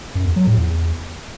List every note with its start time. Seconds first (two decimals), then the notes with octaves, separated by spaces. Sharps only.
0.15 F#2
0.26 E2
0.36 F#3
0.47 A2
0.57 E2